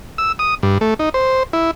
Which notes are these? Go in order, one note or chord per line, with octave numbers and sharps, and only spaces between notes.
E6
D#6
G2
A3
D#4
C5
E4